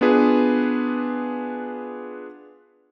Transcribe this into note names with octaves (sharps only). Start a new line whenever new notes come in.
B3 D4 F4 G#4 B4